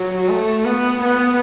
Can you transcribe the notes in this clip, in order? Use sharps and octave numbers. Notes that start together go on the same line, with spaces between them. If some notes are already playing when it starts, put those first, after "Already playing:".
Already playing: F#3
A3
B3
B3